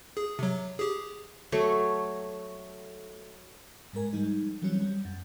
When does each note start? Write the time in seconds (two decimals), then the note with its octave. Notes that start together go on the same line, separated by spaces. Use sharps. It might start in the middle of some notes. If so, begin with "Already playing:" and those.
0.17 G#4
0.39 C3 F#3
0.79 G4 G#4
1.52 F#3 A3 C#5
3.93 G#2 G#3 A#4 G#5
4.13 F3 G3 G#3 D#4
4.62 E3 F#3 G3 C4 C#4
4.81 G3
5.05 F#2